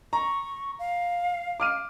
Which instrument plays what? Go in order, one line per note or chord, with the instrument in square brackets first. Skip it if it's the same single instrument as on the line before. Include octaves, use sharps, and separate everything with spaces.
[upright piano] A#5 [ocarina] C#6
[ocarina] F5
[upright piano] D6 F6 D#7